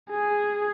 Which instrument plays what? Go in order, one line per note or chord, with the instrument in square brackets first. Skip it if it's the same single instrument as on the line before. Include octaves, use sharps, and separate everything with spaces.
[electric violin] G#4